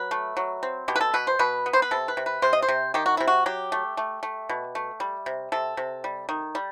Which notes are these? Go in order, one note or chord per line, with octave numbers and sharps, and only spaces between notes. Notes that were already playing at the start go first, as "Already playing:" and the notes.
Already playing: F#3 B4
A3
F#3
C4
B2 G4
B4
A4
B2 B4
C5
B2 B4
B3
C5
B4
C3 A4
B4
C3
B4
C3 C5
D#5
C5
C3
D#3 G4
F#4
C3 E4
F#4
F#3 G4
A3
A3
A3
B2
A3
G3
C3
C3 A4
C3
G3
D#3
G3